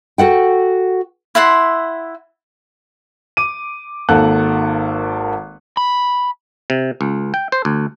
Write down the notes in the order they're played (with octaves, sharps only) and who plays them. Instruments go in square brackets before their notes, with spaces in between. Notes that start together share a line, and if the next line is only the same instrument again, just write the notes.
[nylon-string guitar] F#4 A4 F#5 G5
[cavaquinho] E4 E5 F#5 C6
[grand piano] D6 D#7
G#1 D#3 A#3 A4 F#5 F#6
[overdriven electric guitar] B5
[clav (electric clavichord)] C3
C#2
G5
C5
D2